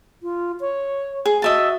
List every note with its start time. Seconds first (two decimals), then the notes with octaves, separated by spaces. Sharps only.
0.23 F4
0.60 C#5
1.26 G#4
1.42 F#4 D#5 E5 A5